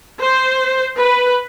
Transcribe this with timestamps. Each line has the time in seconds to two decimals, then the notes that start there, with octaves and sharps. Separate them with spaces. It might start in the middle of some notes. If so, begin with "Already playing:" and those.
0.21 C5
0.99 B4